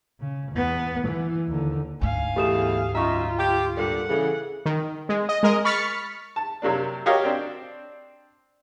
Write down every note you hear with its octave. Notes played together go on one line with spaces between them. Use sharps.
C#3
E2 B3
E3
D#2 D3
D2 G#2 F5 G#5
E2 B2 A3 G4 D#6 E7
F#2 D#4 F4 E5 A#5 C#6
G4
G2 A#2 A4 D5 F#5
C#3 E3 G#4 A4
D#3
G#3
D#5
G#3 A#4 D#5
B5 C#6 F6 A6 B6 C#7
A5
C3 F#3 A#3 D4
F#4 G4 A#4 C#5 D#5 F5
C4 D4 G5